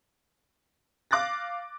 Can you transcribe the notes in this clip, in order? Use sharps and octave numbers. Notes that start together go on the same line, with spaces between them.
F5 D6 F#6 A6 A#6